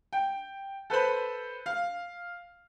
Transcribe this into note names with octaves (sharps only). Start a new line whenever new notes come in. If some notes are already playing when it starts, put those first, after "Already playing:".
G5
A4 B4 C5 B5
F5